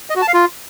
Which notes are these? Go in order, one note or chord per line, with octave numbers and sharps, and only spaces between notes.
D#5
F#4
A5
F5
F4